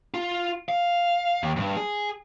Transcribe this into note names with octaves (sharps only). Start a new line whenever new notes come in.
F4
F5
D#2
D2 G2
G#4